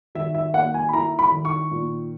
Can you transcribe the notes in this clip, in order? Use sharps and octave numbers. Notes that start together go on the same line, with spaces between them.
D#3 E5
E5
A#3 F#5
G#5
B5
E4 A#5
B5
D#3
C#6
A#2